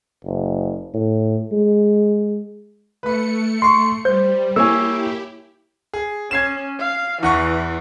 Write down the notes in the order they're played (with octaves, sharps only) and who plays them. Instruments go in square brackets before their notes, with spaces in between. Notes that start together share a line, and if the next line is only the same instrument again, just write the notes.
[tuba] F#1
A2
G#3
[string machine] A3 C#7 [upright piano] B4 B5
[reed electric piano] C6 [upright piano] C#6 C7
[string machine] G3 [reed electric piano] C5 [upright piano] G6
[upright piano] A#3 C#5 G#5 [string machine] E4 G4 [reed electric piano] E6
[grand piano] G#4
[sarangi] C#4 [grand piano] G#6 C7 E7
[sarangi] F5
[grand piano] E2 F#5 C#6 [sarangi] E3